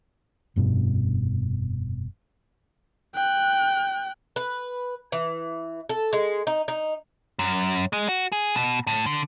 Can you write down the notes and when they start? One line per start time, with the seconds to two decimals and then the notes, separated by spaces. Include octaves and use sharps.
0.56 F1 G2 B2
3.15 G5 F#6
4.36 B4
5.12 E3
5.89 A4
6.13 G#3
6.47 D#4
6.68 D#4
7.39 F#2
7.93 G#3
8.09 F#4
8.32 G#4
8.55 B2
8.87 A2
9.06 D3